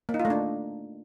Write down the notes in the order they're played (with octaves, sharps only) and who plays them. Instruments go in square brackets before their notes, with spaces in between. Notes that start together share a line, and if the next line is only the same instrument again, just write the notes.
[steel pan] A#3
D#4
F4
A3
D4